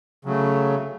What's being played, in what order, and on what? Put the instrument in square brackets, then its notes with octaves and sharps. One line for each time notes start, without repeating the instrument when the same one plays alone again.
[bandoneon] C#3 F#3 A3